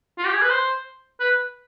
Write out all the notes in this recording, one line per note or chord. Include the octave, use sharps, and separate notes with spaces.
F4
G4
G#4
B4
C5
B4